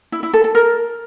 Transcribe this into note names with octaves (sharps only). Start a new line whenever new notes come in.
E4
E4
A4
A4
A#4